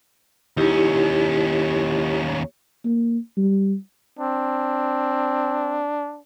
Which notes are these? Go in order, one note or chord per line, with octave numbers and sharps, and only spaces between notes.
D#2 C#4 D#4 E4 G4
A#3
G3
C4 D4